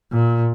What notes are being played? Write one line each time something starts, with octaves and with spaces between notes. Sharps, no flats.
A#2